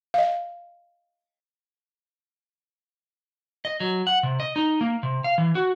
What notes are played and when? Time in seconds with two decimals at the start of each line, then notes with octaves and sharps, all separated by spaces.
0.14 D#5 F5
3.65 D#5
3.80 F#3
4.07 F#5
4.23 C3
4.40 D#5
4.56 D#4
4.81 A#3
5.03 C3
5.24 F5
5.38 E3
5.55 F#4